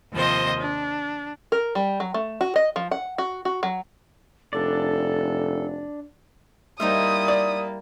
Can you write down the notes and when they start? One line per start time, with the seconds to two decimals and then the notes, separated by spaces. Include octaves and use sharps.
0.13 D#2 C3 F3 C5 D#5
0.59 D4
1.52 A#4
1.75 G3
2.00 F#3
2.14 A3
2.41 F#4
2.56 D#5
2.76 F3
2.91 F#5
3.18 F#4
3.45 F#4
3.63 F#3
4.53 F1 D4 A4 D5
6.80 G3 A#3 D#4 E4 C5 E5 D#6
7.28 D5